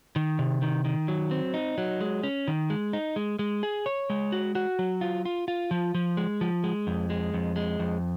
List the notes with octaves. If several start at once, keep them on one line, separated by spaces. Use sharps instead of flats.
D#3
C3
D#3
D#3
F#3
C4
D#4
F#3
G#3
C#4
D#3
G#3
D#4
G#3
G#3
G#4
C#5
G#3
F#4
F#4
F#3
F4
F4
F4
F3
F3
G#3
F3
G#3
F2
G#3
F2
G#3
F2